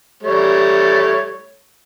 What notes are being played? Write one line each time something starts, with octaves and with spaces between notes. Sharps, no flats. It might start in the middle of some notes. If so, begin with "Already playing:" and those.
G3 A3 C#5